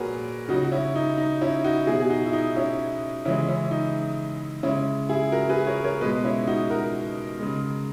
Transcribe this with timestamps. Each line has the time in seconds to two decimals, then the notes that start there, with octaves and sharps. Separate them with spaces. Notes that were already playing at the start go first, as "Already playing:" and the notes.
Already playing: A#2 F#4 G#4 A#4 B4 C#5
0.49 C#3 F#3 D#4 F#4
0.64 F#4
0.72 C#4 E4
0.95 D#4
1.18 D#4
1.41 C#4 E4
1.64 D#4 F#4
1.87 B2 F#3 E4 G#4
2.00 G#4
2.10 D#4 F#4
2.26 E4
2.33 D#4
2.56 C#4 E4
3.25 C#3 E3 G#3 C#4 E4
3.48 C#4 E4
3.71 D#4
4.63 C#3 G#3 C#4 E4
5.09 E4 G#4
5.32 F#4 A#4
5.49 G#4 B4
5.67 A#4 C#5
5.84 A#4 C#5
6.01 B2 B4 D#5
6.05 G#3
6.24 C#4 E4
6.47 D#4 F#4
6.70 F#4 A#4
7.40 C#3 G#3